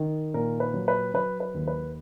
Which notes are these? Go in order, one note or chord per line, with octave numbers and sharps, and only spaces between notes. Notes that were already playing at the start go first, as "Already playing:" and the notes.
Already playing: D#3
A#2 A#4
B4
F#3
B4
F#3 B4
B4
D#2
B4